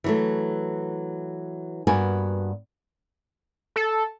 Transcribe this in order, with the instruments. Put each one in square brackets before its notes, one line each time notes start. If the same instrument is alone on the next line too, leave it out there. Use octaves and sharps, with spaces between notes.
[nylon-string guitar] E3 F#3 A3
G2 A#3 B3 F#4 G#5
[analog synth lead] A4